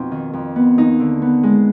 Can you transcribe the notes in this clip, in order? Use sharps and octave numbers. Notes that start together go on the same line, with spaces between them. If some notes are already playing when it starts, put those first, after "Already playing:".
Already playing: F2 B2 C4 D#4
D#3
F2
B3
D#2 D#4
D3
B3
G#3